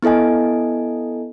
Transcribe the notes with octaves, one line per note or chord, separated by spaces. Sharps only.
B3 E4 A4 D#5 G#5